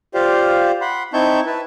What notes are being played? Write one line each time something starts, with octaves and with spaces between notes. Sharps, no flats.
F4 G4 C5 D5 F5
F#5 B5 C6
C4 D#4 E4 A5 C#6 G6
E4 B4 A5